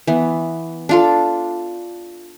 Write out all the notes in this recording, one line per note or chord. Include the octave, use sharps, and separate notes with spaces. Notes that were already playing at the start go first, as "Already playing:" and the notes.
E3 B3
D4 F4 A4